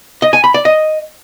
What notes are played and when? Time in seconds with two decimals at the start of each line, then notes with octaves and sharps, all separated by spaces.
0.22 D#5
0.33 G#5
0.44 B5
0.54 D5
0.65 D#5